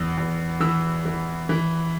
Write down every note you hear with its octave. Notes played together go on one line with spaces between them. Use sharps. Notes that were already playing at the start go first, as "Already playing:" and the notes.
Already playing: E2 E6
E2
E3 E6
E3
E3